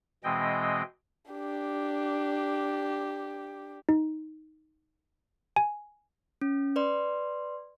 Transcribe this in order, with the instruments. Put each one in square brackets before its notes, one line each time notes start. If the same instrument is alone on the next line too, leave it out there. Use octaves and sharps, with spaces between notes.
[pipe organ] B2 E3 G#3 C4 D#5 G5
[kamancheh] D4 G4
[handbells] D#4
G#5
[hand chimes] C#4
B4 D5 C6